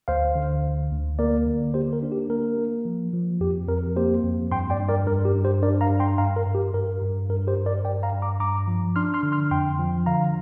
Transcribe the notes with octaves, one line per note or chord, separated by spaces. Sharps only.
D2 C5 F5
D3
D2
D2
A#3 A#4 D5
D3
A#3 G4 C5
A#4
D4
G4
A#3 A#4
A#3
F3
F3
F2 G4
F2 A#4
A#3 G4 C5
F2
G2 G5 C6
D5 G5
G2
A#4 D5
G2 A#4
G4
G2
G4 C5
D4 A#4 D5
F5 A#5
G2
G5 C6
G2 F5 A#5
A#4
G2
G4
G2 A#4
G2
G2 A#4
G4 C5
G2
A#4 D5
G2 D5 G5
F5 A#5
G2
A#5 D6
G2 A#5 D6
F3
D4 C6 F6
C6 F6
D3
C6 F6
F2 G5 C6
F3
D3 F5 A#5